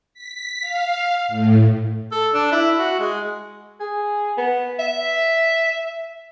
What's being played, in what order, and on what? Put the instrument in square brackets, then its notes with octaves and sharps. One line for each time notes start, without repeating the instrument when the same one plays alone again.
[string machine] B6
F5
A2
[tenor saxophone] A4
D4
E4
F#4
G#3
[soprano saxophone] G#4
B3
E5